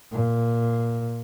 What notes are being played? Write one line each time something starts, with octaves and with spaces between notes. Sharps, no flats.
A#2